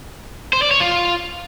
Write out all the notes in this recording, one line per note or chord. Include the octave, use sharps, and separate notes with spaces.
C5
D5
C#5
F4